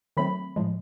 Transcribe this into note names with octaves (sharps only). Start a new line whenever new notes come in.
D#3 F#3 A3 C4 B5
A2 F3 G#3